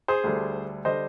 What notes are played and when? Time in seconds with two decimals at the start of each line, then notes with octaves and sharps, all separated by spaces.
0.08 G#4 C5
0.24 D2 D3 G3
0.85 D3 G3 C5 D#5